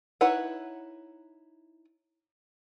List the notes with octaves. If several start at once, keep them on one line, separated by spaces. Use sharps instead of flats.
D#4 E4 B4 C#5 F#5